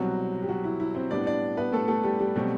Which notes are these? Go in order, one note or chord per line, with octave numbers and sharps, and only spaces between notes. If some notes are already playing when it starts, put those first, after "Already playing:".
Already playing: C2 B2 F#3 G3 C4 F#4
G4
F#3 F#4
E4
E4
C4 C5
A2 G3 B3 D4 D5
D4 D5
B3 B4
A3 A4
A3 A4
G3 G4
G3 G4
B2 F#3 G3 A3 C4 G4